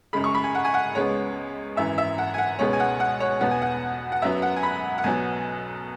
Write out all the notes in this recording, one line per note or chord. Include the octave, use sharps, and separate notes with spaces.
F#2 C#3 G#3 B5
C#6
B5
G#5
F#5
G#5
F#5
C#2 C#3 G#3 B3 C#5
G#1 F#2 E3 E5
E5
F#5
G#5
F#5
C#2 B2 G#3 B3 C#5
G#5
F#5
F#5
C#5
E2 B2 B3 F#5
G#5
F#5
F#5
F#2 F#3 B3 E5
F#5
G#5
B5
F#5
B1 B2 F#3 B3 G#5